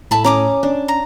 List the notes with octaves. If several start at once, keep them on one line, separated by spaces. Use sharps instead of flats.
A2 A3 E5 A5 B5
C#4 A#5 D6 D#6
C#4 D4
A#5